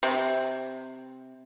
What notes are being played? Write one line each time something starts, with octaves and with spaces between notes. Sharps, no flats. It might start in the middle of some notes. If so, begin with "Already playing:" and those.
C3